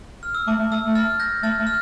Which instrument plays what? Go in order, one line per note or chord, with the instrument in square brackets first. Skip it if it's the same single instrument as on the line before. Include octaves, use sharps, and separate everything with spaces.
[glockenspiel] F6
E6
[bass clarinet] A3 [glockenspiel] D6
[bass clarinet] A3
[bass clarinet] A3 [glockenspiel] E6
[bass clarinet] A3
[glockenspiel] F6 A6
G6 A#6
[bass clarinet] A3 [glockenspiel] F6 A6
[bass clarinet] A3
[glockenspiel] F6